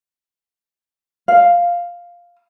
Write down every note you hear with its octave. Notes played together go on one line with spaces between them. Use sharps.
F5